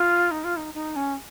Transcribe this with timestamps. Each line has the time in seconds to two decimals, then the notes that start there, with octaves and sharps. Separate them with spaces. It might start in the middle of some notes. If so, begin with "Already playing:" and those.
Already playing: F4
0.31 D#4
0.44 F4
0.57 D#4
0.74 D#4
0.96 C#4